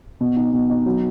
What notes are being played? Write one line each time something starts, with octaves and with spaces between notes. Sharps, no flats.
B2
D#4
B2
D#4
F#3